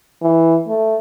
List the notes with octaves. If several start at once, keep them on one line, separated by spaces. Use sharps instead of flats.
E3
A3